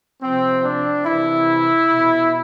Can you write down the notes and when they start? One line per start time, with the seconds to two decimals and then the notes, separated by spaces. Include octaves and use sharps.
0.22 C3 F3 C4
0.63 D4
1.05 C3 E3 E4
1.87 B2